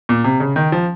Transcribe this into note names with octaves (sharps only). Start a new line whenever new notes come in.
A#2
C3
C#3
D#3
F3